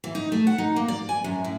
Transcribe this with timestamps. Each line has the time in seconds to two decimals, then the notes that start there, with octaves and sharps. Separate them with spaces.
0.04 E3
0.15 D#4
0.32 A3
0.47 F#5
0.58 D#4
0.76 A#3
0.88 D5
1.09 G#5
1.24 F#2
1.44 A2